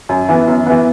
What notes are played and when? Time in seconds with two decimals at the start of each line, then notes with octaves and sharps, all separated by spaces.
0.09 F#2
0.29 E3 B3
0.48 F#2
0.66 E3 B3